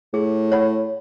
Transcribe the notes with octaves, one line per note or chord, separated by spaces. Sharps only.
A2 G#4
C#5 F#5 B5